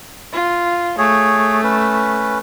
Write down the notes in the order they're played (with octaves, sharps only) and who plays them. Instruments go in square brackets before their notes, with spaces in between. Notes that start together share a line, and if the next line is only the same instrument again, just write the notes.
[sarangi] F4
[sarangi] A3 [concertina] G#4 C#5
[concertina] C#4 B4